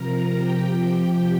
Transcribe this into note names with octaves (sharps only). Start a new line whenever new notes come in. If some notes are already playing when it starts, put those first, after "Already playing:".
Already playing: C3 F3 A#4 A#5
C3 F3 G4 G5